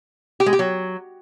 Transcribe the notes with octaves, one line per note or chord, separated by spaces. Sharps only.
G4
G#3
G4
F#3